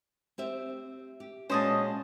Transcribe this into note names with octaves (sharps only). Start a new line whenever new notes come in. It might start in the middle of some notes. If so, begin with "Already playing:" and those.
C4 G4 E5
G4
A#2 G#3 C#4 F#4 C5 D#5 A5